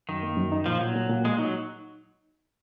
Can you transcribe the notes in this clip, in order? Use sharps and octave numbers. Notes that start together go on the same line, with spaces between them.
F#2 D#3
A#3
F#2
D#4
A#2 F3
A#2 F#3
A#2
A#2
G#3 A#3
F#3 D#4